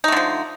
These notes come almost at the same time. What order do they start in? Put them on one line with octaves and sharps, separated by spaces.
D#4 A3 D3 F3